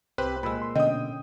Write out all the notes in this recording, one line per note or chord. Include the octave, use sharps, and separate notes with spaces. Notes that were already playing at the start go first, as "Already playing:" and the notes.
C2 C4 G4 B4 C5 F#6
A#2 G#3 B5 E6
C6
B2 D3 C#4 D#5 G5 D#6